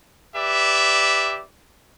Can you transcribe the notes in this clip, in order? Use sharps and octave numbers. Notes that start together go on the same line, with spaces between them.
G4 B4 D5 E5